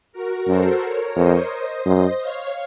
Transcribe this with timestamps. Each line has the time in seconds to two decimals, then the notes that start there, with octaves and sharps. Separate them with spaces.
0.12 F#4 A#4
0.47 F#2 A4 C5
0.82 A#4 C#5
1.16 F2 C5 D#5
1.86 F#2
2.20 C#5 F5